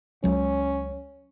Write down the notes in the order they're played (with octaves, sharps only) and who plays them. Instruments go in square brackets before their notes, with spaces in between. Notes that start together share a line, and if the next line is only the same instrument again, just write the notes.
[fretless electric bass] C#2 F#3 [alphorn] C#4